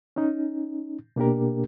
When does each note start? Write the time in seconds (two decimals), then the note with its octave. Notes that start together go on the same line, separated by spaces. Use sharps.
0.16 C#4 D#4
1.16 B2 A#3 D4 G4 A#4